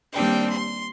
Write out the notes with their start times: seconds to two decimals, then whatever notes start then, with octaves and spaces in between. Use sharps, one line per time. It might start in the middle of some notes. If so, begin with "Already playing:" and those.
0.12 D#2 G3 C4 D4 G5
0.48 C6